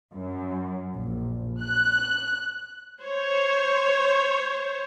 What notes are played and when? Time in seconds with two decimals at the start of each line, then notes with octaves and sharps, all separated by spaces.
0.12 F#2
0.95 A#1
1.63 F#6
3.03 C5 C#5